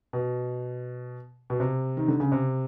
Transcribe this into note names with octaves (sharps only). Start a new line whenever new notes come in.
B2
B2
C3
D#3
D3
C#3
C3